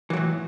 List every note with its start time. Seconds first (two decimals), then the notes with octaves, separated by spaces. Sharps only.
0.10 E3
0.13 F#3
0.17 A2